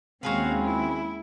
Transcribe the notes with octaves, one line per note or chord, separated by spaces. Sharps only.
D#2 G#3 C4 C#4 F#4 G#4 B4 F5
E4